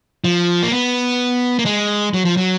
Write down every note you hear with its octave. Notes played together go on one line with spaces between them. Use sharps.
F3
A#3
B3
A#3
G#3
F#3
F3
F#3